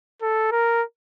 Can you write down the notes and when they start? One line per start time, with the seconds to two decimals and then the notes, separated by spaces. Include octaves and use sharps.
0.22 A4
0.52 A#4